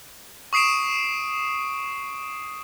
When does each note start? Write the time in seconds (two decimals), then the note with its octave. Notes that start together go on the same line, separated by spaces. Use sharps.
0.53 C#6 D#6 C7 D7 E7